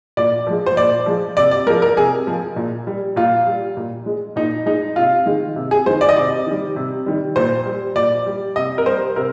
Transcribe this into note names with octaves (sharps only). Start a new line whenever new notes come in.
A#2 D5
F3 G#3
C5
A#2 D5
F3 G#3
C3 D5
D5
F3 G#3 A#4
A#4
C3 G#4
F3 G#3
A#2
G3
A#2 F4
G3
A#2
G#3
A#2 D#4
G#3 D#4
C3 F4
D#3 G#3
C3
G#4
D#3 G#3 C5
D5
D#5
C3 D5
D#3 G3
C3
D#3 G3
A#2 C5
G3
A#2 D5
G3
C3 D#5
A#4
G3 C5
C3 A#4